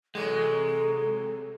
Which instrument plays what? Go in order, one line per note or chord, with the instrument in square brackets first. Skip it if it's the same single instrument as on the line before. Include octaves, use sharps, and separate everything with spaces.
[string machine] C3 [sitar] E3 F#3 [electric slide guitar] G#3 [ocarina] A4